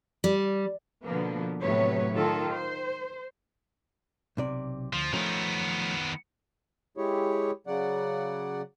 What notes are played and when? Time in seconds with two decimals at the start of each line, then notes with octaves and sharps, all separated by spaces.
0.24 G3
1.05 B2 D3 F3 A#3 B3
1.61 A2 C3 F#3 B3 B4 C#5
2.12 D#3 F4 A4
2.54 C5
4.37 B1 C3 D5
4.93 D2 F3
5.13 D#3 F3 A3 B3 C#4
6.97 G#3 E4 G4 G#4 C#5
7.67 C#3 F#3 D5 F#5